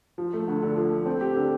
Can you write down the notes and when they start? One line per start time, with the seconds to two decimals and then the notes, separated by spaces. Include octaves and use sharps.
0.18 F3
0.34 A3
0.48 D2
0.62 D3
0.76 F3
0.92 A3
1.06 C4
1.21 G4
1.35 D3